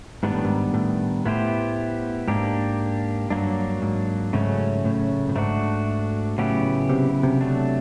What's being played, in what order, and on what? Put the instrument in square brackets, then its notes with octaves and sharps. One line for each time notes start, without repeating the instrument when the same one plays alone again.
[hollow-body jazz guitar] G#2 [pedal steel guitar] D#3 G3 B3 D4
[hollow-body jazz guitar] A2
G#2
A2
[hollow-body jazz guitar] A2 [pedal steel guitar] B3 E4 G4 C5
[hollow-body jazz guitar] G#2 [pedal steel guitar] A#3 D4 G4
[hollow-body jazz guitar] G2 [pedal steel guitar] F#3 A#3 D4
[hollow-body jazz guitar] G#2
[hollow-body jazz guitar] G#2 [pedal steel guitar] C#3 F#3 A3 C#4
[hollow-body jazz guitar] A2
A2
[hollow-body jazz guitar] G#2 [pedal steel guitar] A3 D4 F#4
[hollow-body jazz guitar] A2 [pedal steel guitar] C#3 F#3 B3 E4 G4
[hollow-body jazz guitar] C3
C3
[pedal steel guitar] F#3 A3 D4